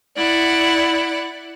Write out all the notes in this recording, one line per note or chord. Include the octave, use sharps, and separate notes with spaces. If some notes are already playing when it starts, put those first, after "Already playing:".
E4 D5 F#5